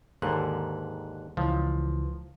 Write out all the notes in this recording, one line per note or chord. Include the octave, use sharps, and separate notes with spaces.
D#2 G#2 D3 F#6
C#2 E3 F3